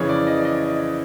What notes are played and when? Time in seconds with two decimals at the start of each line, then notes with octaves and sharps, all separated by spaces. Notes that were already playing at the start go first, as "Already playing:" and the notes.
Already playing: F2 C#3 E3 C#5
0.09 D5
0.27 D#5
0.40 D5
0.45 D#5